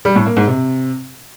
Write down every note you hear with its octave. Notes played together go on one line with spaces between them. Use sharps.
G3
A2
A#3
G#2
C3